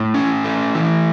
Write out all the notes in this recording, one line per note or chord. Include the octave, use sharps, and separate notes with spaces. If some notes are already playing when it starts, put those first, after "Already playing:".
Already playing: A2 A5
C#4
A3
E3